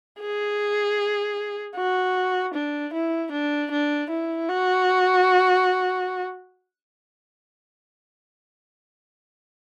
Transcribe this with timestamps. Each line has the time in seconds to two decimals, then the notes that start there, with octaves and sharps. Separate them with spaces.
0.20 G#4
1.76 F#4
2.54 D4
2.93 E4
3.32 D4
3.71 D4
4.10 E4
4.48 F#4